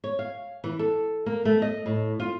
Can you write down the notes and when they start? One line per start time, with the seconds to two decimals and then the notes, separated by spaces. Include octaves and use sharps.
0.04 C#5
0.19 F5
0.64 E3
0.79 A4
1.26 A#3
1.45 A3
1.62 D#5
1.86 A2
2.20 F4